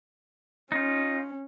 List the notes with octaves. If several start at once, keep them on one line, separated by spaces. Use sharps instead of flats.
C#4 D#4 F4